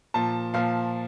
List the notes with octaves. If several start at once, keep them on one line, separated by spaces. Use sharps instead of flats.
A#2 F3 A5
A#2 F3 F5